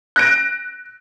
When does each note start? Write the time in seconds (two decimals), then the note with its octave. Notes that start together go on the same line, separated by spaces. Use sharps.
0.16 F#6 A#6 D7